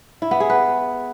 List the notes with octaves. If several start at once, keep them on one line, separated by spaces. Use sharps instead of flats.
E4
B3
G#4
B4